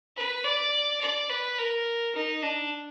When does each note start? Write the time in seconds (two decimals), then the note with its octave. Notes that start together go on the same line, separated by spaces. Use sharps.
0.16 B4
0.44 D5
1.01 D5
1.29 B4
1.58 A#4
2.15 D#4
2.42 D4